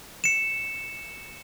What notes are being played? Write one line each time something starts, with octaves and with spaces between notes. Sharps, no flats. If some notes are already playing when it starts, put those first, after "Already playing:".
C#7 E7